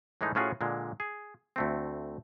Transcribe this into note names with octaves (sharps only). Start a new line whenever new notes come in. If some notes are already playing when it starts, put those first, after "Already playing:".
A2 E3 G#3 A3 D#4
A2 F3 C#4 F4 F#4 G#4
A#2 D3 G#3
G#4
D2 A3 C4